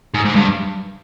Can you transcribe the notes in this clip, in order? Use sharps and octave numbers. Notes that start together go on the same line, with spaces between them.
G#2
G#2
G2